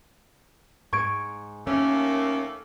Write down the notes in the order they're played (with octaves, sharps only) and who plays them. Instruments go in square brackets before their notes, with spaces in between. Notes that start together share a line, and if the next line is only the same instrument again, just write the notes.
[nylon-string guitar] G#2 [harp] C#6 G#6 D7
[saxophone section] D#2 A3 A#3 [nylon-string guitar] C#4